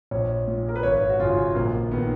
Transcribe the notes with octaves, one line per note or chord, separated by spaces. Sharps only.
A#1 C#5
A#2
A#4
B4
G#1 C#5
F#4
F#2 C#3 F4
A#1 A#3
D#3 B3